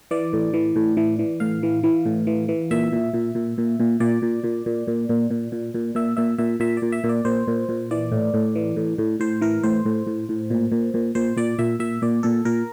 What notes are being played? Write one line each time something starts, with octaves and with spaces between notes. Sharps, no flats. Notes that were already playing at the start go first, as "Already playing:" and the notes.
E3 D5
A2
E3
A2
E3
E3
A2 F5
E3
E3
A2
E3
E3
A#2 E5
A#2
A#2
A#2
A#2
A#2
A#2 D5
A#2
A#2
A#2
A#2
A#2
A#2
A#2
A#2
A#2 E5
A#2 E5
A#2 E5
A#2 E5
D5
A#2
E5
A#2
D5
A#2 C5
A#2
A#2
E3 D5
A2
A2
E3
A2
A2
A2 C5
E3 A#4
A2 C5
A2
A2
A2
A#2
A#2
A#2
A#2 C5
A#2 D5
A#2 E5
A#2 E5
A#2 D5
A#2 A4
A#2 A#4